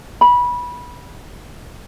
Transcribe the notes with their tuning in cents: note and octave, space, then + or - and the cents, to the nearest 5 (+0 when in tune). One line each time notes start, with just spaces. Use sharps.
B5 -20